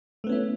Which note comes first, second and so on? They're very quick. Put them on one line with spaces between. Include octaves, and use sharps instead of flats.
A3 B3 C#4 E4